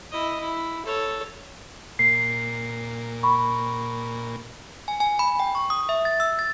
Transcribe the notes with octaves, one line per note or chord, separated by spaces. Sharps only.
E4 D#5
E4
A4 C#5
A#2 C7
B5 C#6
G#5
G#5
B5
G5
C#6
D#6
E5
A6
E6
A6